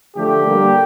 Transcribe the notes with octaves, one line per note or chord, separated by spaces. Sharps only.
D3 F3 A3 G4
D3 G3 A#3